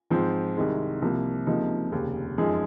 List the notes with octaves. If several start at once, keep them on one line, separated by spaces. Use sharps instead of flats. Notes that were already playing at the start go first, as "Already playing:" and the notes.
G#2 F3 C4
C2 C3 D#3 G#3
C2 C3 F3 A#3
C#2 C3 F3 A#3 D#4
F1 D#2 C#3
F#2 F3 G#3 D#4 G#4